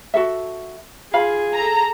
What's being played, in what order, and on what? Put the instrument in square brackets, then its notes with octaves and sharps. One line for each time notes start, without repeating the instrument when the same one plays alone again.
[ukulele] F#4 A4 E5
[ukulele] F4 F5 B5 [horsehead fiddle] G#4
[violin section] A4 A#5